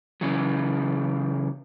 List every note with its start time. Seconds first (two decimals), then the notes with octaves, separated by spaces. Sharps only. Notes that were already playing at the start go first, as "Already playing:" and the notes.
0.21 C#3 E3 F#3